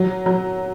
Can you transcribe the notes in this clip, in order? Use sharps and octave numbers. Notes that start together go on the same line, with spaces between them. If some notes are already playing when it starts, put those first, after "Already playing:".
Already playing: F#3
F#3